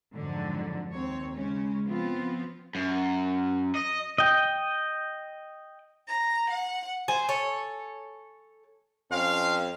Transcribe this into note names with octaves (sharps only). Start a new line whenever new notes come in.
F2 G#2 D3 F#3
D#2 C4 C#5
C#3 G#3 C#4
F3 B3 C4 F4
F#2
D#5
D#5 G5
A#5
F#5
C5 G#5
A4 C#5
F2 C4 C#4 F5